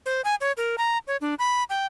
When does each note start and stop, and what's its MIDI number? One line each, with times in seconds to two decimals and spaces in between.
0.06 0.21 72
0.25 0.35 80
0.41 0.52 73
0.57 0.76 70
0.78 0.98 82
1.07 1.17 73
1.21 1.35 62
1.39 1.64 83
1.70 1.86 79